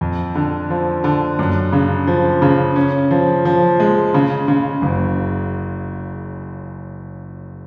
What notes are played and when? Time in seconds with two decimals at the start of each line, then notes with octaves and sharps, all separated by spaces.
0.01 F2
0.35 D3
0.70 F3
1.04 D3
1.39 F#2
1.72 C#3
2.07 F3
2.42 C#3
2.76 C#4
3.11 F3
3.45 F3
3.80 G#3
4.14 C#3
4.48 C#3
4.82 F#1